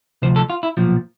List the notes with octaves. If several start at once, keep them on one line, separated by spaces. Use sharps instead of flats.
D2 C3 F3 C5
A4
F4
E4
B1 A#2 F3